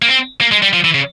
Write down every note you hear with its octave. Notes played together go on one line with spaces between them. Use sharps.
A#3
C4
A#3
G#3
G3
F3
E3
C#3